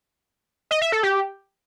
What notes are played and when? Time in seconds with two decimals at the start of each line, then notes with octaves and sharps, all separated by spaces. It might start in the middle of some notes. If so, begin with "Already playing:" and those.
0.71 D#5
0.82 E5
0.92 A4
1.03 G4